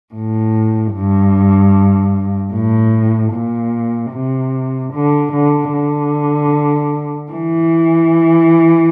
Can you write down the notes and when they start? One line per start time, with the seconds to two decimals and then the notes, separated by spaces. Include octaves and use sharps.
0.14 A2
0.93 G2
2.54 A2
3.33 A#2
4.13 C3
4.93 D3
5.32 D3
5.73 D3
7.32 E3